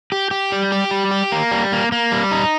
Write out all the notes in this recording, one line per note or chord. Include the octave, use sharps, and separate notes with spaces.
G4
G4
G3
G4
G3
G4
A#3
G3
A#3
A#3
G3
D#4